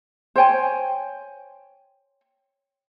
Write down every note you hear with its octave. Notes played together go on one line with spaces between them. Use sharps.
C5 C#5 G5 G#5